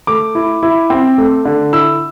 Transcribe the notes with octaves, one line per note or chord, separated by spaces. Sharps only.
A3 D6
E4
E4
C4
A3
D3
E4 E6